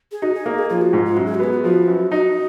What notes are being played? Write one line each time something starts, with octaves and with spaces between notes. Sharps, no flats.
G#4
D#4 F#4
G#4
A#3 A#4
G#4
F3 G#4
F#4
G#2 F4
F4
F#2 F#4
G#4
F#4
B3 G#4
F#4
F3 F#4
F#2
D#4 F#4